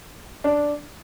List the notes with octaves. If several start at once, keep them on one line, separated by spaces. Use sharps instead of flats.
D4